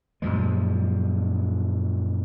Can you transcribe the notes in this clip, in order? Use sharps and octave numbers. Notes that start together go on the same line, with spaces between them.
F#2 A#2 F3 G#3